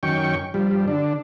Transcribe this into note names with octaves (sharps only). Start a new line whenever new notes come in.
F#2 D#3 C#4 G5 C#6
G2 F3 G3
D3 D4